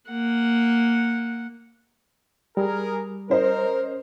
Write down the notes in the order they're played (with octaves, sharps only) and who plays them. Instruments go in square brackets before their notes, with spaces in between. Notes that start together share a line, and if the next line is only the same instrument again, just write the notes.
[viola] A#3 F#5
[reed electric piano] G3 [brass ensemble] G#4 A#4
[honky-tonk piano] C#4 C5 D#5 [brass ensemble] A#4